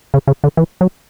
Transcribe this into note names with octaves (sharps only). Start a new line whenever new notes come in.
C#3
C#3
D3
E3
F#3